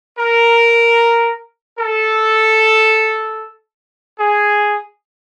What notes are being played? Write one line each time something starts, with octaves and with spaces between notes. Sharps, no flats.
A#4
A4
G#4